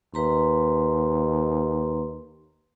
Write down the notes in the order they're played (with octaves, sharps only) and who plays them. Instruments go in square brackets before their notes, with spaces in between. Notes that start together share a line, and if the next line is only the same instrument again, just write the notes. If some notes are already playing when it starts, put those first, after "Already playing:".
[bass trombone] D#2 [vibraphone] B4 A#5 C6